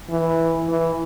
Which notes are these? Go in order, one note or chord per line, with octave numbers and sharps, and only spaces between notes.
E3
E3